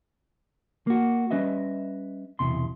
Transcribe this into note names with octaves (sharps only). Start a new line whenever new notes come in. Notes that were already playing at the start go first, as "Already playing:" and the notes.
A#3 F#4
G3 C#4 B4 D#5 E5
B1 E2 C3 C6